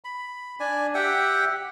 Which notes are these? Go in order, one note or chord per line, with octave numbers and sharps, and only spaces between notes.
B5
D4 D5 G#5
G4 E5 F#5 G5